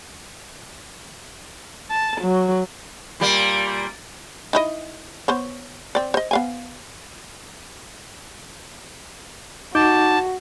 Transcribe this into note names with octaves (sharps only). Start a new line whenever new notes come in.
A5
F#3
A#2 G3 A#3
D#4 E4 D#5
B3 C5 C#5
C4 D5
C5 D#5
B3 F5 G#5
D#4 F#4 A5 D6 G6